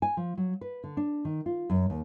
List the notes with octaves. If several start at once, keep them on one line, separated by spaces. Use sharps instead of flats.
G#5
F3
F#3
B4
D3
D4
D#3
F4
F#2
D#2